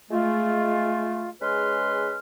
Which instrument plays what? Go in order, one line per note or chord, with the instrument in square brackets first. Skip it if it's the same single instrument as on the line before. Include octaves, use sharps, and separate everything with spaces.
[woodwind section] G#3 A3 F4
G#3 C#4 G#4 B4 C6 F6